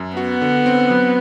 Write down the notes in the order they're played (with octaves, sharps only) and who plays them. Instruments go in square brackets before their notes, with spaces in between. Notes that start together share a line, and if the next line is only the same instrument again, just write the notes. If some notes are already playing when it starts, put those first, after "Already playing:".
Already playing: [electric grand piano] F#2
[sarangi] B3 [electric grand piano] F#4
[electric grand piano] D3
C4
F#3